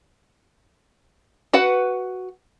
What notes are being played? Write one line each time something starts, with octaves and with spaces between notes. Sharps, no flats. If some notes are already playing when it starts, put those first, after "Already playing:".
F#4 B4 F#5